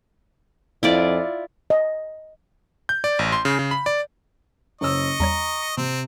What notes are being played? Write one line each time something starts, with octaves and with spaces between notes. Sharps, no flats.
F2 E4 F4 D5
D#5
G6
D5
A1
C6
C#3
C#3
B5
D5
F#1 C#5 D#5 C#6 E6
E2 G3 C#5 A#5
C3 C4